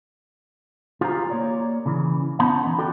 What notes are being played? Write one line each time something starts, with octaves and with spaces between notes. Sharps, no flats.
F4 G4 G#4 C5 F5 A#5
A#3 C#5 D5
C#3 E3
B3 C#4 D#4 C5 A5 B5
E3 B4
F4 F#4 A4 D5 D#5 G5